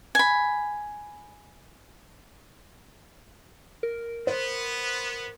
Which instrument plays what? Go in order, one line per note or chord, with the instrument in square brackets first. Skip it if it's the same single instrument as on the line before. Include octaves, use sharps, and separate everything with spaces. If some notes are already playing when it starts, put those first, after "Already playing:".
[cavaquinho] G#5 B5
[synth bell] A#4
[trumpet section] B3 [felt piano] C5